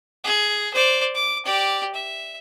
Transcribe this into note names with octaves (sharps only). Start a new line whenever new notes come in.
G#4
C5 D5
D6
G4 D5
E5